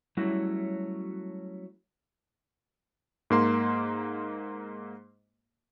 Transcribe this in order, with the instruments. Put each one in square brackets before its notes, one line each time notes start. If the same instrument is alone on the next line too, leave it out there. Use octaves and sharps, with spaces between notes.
[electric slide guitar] F#3 G3 A3 C#4 E4 F#4
[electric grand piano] G#2 A#3 C6